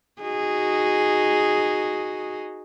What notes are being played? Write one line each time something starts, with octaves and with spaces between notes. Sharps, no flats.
D#4 F#4 G#4